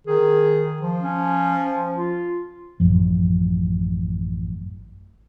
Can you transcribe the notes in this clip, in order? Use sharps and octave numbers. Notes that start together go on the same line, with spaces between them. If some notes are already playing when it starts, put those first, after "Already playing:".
D#3 G#4
F3
C#4
F4
A1 F#2 F3